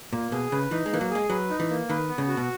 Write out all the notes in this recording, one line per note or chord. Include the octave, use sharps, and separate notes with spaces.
A#2 A#3
B2 G#4
C#3 B4
E3 D#4
G#3
E3 A#3
F#3
G#3 G#4
F#3 B4
D#4
E3
A#3
D#3 B4
B3
C#3
F#4
B2